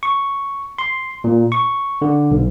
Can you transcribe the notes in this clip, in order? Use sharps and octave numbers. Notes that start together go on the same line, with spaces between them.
C#6
C6
A#2
C#6
D3
B1